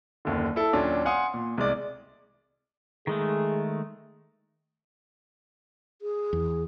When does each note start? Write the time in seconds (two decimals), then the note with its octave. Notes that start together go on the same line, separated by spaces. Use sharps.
0.25 F#1 D#2 D3
0.56 E4 A4
0.73 D#2 A#2 F#3 C#4 D4
1.05 F5 F#5 G#5 C6 D#6
1.34 A#2
1.58 C2 G#3 D5
3.07 D#3 G#3 A3 G#4
6.02 G#4
6.33 E2